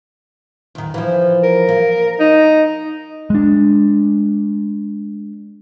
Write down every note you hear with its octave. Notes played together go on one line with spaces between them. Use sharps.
E2 D#3
E3 F3
A#4
A#3
D#4
G#3 D4